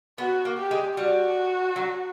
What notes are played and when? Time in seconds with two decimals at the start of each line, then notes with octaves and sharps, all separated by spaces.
0.18 B3 F#4
0.45 A#3
0.58 G4
0.71 G#3
0.97 G3 F#4
1.76 F#3